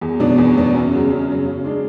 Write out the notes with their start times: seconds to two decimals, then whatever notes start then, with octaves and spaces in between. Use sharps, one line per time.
0.01 E2
0.19 B2 F#3 B3 D4
0.38 E2
0.56 B2 F#3 B3 D4
0.74 F#2
0.92 C#3 F#3
1.09 F#2
1.28 C#3 F#3
1.46 C#3
1.64 G#3 D4